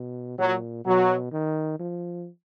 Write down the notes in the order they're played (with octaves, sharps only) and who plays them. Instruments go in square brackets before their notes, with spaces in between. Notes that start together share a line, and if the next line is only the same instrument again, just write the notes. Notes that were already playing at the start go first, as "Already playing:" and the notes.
Already playing: [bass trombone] B2
[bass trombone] A#2 [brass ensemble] F#3
[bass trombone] B2 [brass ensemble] F#3
[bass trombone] D#3
F3